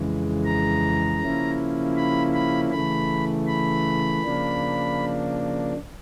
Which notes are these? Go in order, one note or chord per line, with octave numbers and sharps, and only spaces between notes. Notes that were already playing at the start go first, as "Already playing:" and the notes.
Already playing: F2 C#3 E3 G#3
A#5
C#3 F3 A#3 C#4 E4
B5
B5
C#3 E3 A3 B5
B5
C#3 F3 A#3 D4